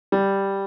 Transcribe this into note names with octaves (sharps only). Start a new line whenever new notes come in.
G3